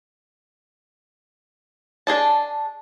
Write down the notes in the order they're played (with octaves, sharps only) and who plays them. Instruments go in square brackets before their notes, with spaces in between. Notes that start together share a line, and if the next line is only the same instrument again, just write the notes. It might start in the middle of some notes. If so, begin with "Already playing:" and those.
[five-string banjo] D4 G#4 D#5 A5